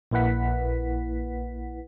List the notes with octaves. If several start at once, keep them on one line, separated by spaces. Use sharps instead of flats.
A#1 A#3 E4 B4 F#5 B6